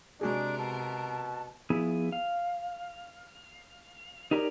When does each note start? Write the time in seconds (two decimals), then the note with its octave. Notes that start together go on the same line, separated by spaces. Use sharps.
0.21 C3 G#3 D4 F#4 G#4 A#4
0.58 B2 A5
1.70 F3 B3 E4 G#4
2.12 F5
4.31 D#4 G4 A#4 C#5 D5